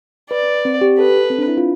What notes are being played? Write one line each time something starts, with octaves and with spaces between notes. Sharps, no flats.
B4 D5
C4
G4
A4 B4
C4
D4
E4
F4